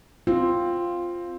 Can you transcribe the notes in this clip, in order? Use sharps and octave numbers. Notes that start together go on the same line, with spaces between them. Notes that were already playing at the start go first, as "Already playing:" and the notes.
C4 F4